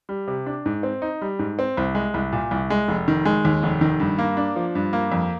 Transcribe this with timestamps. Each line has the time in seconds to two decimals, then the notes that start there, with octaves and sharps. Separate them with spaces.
0.09 G3
0.27 C3
0.46 D4
0.66 G#2
0.83 C4
1.02 D#4
1.22 G3
1.39 G#2
1.59 C4
1.77 C2
1.95 G#3
2.14 C2
2.33 A#2
2.51 C2
2.70 G#3
2.88 F1
3.08 D#3
3.25 G#3
3.45 D#2
3.63 F1
3.81 D#3
4.00 G2
4.18 A#3
4.37 D4
4.56 F3
4.75 G2
4.93 A#3
5.12 F2